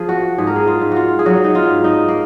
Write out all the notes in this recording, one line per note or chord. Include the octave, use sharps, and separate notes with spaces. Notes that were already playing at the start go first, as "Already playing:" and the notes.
Already playing: F3 G#4
F#4
G#2 G#4
A#4
G#4
F4
G#2
F4 F#4
G#4
F#3 F#4
D#4
F4
G#2
D#4
A#3